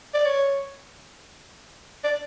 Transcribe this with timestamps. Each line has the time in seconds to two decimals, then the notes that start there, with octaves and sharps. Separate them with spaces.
0.14 D5
0.26 C#5
2.04 D5